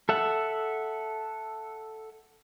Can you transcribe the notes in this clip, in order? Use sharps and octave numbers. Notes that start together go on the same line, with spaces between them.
A4 E5 F#5